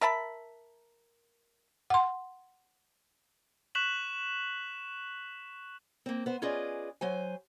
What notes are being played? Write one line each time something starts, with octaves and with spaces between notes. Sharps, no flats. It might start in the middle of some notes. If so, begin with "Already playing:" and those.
A#4 E5 A5 B5
F#5 C6
C#6 F#6 B6 E7 F#7
A#3 C4
B3 C5
C#4 F4 G#4 B4 D5 D#5
F#3 C5 G#5